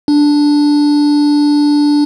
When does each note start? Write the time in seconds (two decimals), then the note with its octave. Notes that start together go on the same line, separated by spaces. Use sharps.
0.08 D4